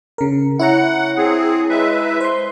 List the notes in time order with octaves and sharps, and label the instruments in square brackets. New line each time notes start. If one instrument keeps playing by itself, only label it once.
[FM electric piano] C#3 A#4
[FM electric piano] E4 C#5 A#5 [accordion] F#5
[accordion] C4 G#4
G#3 B4 E5
[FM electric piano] C5 C6